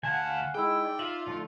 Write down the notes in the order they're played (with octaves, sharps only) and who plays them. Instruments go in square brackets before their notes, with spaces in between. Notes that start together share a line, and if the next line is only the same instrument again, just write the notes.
[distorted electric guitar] D2 A5 [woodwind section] F5 F#5 [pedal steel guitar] G#5
[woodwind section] G#3 D#4 E4 [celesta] G#4 E6 [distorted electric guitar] G5
[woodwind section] D#4 D5
[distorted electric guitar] F4 [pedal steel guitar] E5 [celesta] F#7
[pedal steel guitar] D3 F3 A3